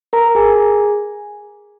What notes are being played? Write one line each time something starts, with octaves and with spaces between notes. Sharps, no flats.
A#4 A#5
G#4 G#5